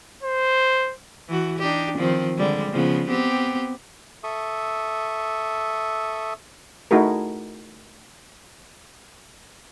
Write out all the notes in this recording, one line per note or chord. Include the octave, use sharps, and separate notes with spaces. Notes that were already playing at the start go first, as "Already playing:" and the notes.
C5
E3 F#4
D4 D#4 G4
D#3 F3 C4
D3 G3 G#3
C#3 F3 B3
B3 C4 G4
A4 E5 C#6 D#6
A3 D#4 E4 F#4 G#4 A#4